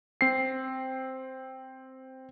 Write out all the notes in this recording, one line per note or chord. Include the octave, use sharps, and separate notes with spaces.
C4 C7